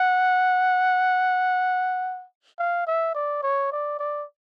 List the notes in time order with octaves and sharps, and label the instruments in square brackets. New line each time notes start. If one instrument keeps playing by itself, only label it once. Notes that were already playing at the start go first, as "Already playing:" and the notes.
Already playing: [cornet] F#5
F5
E5
D5
C#5
D5
D5